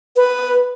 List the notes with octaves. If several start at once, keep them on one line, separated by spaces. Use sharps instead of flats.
B4